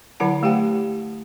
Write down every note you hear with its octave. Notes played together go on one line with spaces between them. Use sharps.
D3 F#3 E4 F#5 A5
A3 G4 F#5 G5